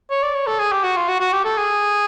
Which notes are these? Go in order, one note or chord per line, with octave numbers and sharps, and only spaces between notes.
C#5
D5
C#5
A4
G#4
G4
F#4
F4
F#4
F#4
G4
A4
G#4